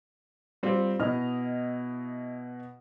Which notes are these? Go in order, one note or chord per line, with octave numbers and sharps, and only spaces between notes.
G3 C4 F4
B2 E4 D#5 F6